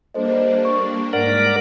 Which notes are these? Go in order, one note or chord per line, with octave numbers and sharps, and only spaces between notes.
G3 A#3 D4 A4 C5 D#5
C#6
G#2 A#4 D5 F#5 B6